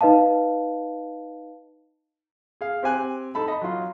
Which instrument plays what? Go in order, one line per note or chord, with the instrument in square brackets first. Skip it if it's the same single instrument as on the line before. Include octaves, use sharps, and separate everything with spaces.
[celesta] D#4 B4 D#5 F5 A5
[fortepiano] G#4 F5
C4 G4 G#5 F#6
D#4 A4 A5 B5
D#5 B5
F#3 F4